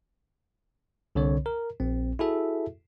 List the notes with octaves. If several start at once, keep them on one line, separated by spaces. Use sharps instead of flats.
C2 D3 C4 C#5
A#4
A#1 C4
E4 F#4 G#4 A4 E5